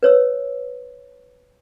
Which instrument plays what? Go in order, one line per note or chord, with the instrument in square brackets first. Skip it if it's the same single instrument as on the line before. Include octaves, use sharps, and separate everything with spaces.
[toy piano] B4 C#5 E6